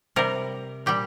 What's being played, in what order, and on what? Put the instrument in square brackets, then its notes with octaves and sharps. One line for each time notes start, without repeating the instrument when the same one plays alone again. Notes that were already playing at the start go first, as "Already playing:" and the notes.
[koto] C3 G3 A#4
A#2 G3 G4